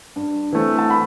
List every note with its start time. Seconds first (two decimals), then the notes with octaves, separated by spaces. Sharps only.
0.16 G2
0.52 E3 A3 C4
0.78 A5
0.90 B5